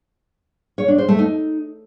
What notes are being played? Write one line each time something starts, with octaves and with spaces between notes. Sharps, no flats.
C#5
D4
C5
A3
D#4